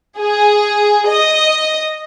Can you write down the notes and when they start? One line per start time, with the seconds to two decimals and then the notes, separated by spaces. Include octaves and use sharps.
0.18 G#4
1.07 D#5